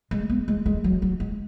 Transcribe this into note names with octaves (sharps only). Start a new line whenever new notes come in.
G#3
B3
G#3
G#3
F#3
F#3
G#3